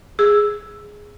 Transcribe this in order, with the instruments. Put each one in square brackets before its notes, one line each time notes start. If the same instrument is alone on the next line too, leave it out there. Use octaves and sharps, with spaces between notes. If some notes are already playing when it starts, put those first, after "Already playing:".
[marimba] G#4 E6